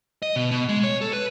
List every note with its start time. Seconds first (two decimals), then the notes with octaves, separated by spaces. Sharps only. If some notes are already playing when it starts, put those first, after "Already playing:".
0.22 D#5
0.36 B2
0.51 B2
0.69 G#3
0.84 C#5
1.01 A4
1.13 B4